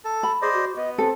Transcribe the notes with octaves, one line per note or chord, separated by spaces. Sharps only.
A4
B5
G#4 C5 D5 D#5
F#4
B3 D#5
C4 A4